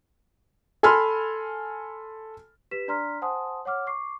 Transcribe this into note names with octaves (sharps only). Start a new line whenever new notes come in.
A4 G#5 B5 C6 F6
G4 B4 B6 E7
D4 D5 A#5 C6 F6 B6
C5 F#5 G#5 A5 C6 D#6
C#5 F#5 D6 F6
C#6 D6 C7